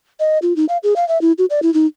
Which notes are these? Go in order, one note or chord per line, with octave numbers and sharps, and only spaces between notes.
D#5
F4
D#4
F5
G#4
F5
E5
E4
F#4
D5
E4
D#4